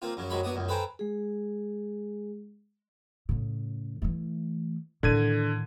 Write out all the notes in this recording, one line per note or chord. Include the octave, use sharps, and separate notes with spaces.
A#3 C4 F4
F#2 C#3 F#3
F#2 C3 F#3 G#3 B5 C6
F#3 B3 D4 D#6
C#2 F#2
A4 B4 C5 G5 G#5 A#5
G#3 G#4
A2 C#3
E3 A3
A2 D3 D#3 G#6 D#7